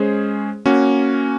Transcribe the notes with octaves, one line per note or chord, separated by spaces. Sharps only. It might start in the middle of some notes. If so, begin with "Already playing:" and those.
Already playing: G#3 C#4 G#4 C5
A#3 C#4 F#4